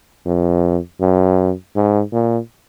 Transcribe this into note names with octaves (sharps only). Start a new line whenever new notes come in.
F2
F#2
G#2
A#2